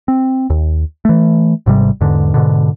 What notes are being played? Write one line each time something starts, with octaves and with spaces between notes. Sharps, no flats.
C4
D#2
E3 A3
G#1 G#2 C3 G3
E2 G#2 D3
G#2 B2 D3